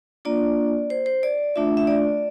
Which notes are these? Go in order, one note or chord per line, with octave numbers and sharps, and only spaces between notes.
A#3 D4 F4 D5
C5
C5
D5
A3 D4 F4 E5
E5
D5